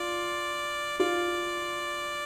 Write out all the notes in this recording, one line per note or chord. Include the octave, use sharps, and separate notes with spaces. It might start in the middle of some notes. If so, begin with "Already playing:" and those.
Already playing: F4 D5
F4 D5